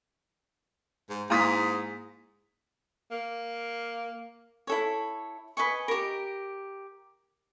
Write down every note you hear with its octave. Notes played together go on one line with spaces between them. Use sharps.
G#2
G#2 A#3 E4 F5 A#5 D#6 B6
A#3
E4 A4 C#5
B4 D#5 G#5 C#6
G4 A#4